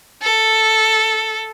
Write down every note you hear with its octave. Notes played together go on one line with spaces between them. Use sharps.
A4